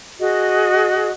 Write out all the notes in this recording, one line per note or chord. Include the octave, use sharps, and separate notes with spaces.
F#4 G#4 D#5